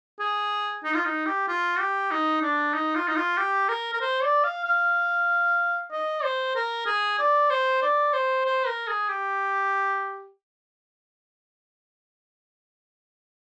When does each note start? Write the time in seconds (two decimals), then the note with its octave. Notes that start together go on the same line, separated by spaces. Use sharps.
0.20 G#4
0.84 D#4
0.95 F4
1.05 D#4
1.26 G4
1.48 F4
1.80 G4
2.11 D#4
2.42 D4
2.74 D#4
2.96 F4
3.08 D#4
3.16 F4
3.38 G4
3.69 A#4
3.93 A#4
4.01 C5
4.23 D5
4.44 F5
4.65 F5
5.92 D#5
6.23 C5
6.55 A#4
6.86 G#4
7.19 D5
7.50 C5
7.82 D5
8.13 C5
8.46 C5
8.67 A#4
8.88 G#4
9.09 G4